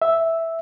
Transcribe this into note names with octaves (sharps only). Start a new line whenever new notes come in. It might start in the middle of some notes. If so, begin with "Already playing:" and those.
E5